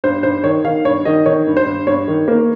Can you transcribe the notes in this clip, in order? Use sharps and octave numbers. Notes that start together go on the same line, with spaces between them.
G2 C5
G2 C5
D#3 C#5
D#3 F5
G2 C#5
D#3 D#5
D#3 C#5
G2
C5
G2
G2 C#5
D#3
A#3